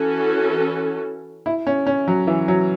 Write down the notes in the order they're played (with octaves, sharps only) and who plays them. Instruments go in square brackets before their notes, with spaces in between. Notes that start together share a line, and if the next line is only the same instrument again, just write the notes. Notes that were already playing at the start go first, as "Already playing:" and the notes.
Already playing: [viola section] E3 C#4 F#4 A4
[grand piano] E4
C#4
C#4
F#3
E3
F#3